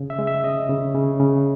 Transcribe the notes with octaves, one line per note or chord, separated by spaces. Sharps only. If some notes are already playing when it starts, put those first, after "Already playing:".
Already playing: C#3
E5
G#3
E5
C#3 D#5
C#3
C#3
C#3